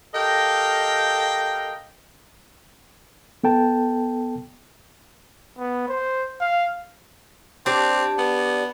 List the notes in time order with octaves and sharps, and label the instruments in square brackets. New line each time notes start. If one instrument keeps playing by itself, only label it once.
[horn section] G4 A4 A#4 D#5 F5 G5
[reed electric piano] B3 A4 G5 A5
[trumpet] B3
C5
F5
[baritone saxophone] C4 [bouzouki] D4 G4
[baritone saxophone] B3